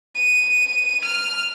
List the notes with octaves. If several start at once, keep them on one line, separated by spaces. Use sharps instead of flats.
D#7
F6